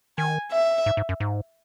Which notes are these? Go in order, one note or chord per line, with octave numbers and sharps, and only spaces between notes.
D#3 G#5
E5
G#2
G#2
F#2
G#2